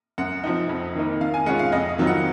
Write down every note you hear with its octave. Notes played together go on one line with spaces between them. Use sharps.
F#2 F#5
F3 C4 D#4
F2
D#3 A#3 D#4
D#3 F5
G#5
G#3 C#4 F4 F#5
F5
F2 D#5
D#3 F#3 C4 F4
F#5